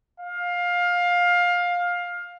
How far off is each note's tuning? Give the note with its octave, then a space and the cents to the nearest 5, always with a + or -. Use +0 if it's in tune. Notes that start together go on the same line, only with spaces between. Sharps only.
F5 +20